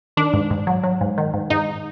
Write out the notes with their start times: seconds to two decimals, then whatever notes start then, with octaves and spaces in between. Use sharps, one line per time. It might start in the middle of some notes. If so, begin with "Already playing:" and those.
0.17 D#3 D4
0.34 G#2
0.51 G#2
0.67 F#3
0.84 F#3
1.01 G#2
1.18 D#3
1.34 G#2
1.50 G#2 D#4